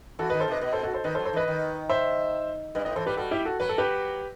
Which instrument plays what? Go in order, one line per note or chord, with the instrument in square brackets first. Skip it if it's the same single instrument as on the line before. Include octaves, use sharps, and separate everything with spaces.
[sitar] E3 [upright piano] F#4 A4
[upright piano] B4 D#5
[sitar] D#3
[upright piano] A4 C5
[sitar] C3 [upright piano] B4 D#5
[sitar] B2 [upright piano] B4 D#5
[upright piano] A4 C5
F#4 A4
A4 C5
[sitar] D#3 [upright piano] B4 D#5
[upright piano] A4 C5
[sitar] F#3
[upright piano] A4 C5
[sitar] E3 [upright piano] B4 D#5
[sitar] D#3
[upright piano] C5 E5
[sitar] G2 [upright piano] B4 D#5
[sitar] A2 [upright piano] B4 D#5
[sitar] E3 [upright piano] A4 C5
[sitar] G3 [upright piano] G4 B4
[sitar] G3 [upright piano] F#4 A4
[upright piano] E4 G4
F#4 A4
[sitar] F#3 [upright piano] B4
[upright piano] A4
G4 B4